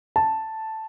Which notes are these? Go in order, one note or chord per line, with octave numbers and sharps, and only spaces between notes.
A5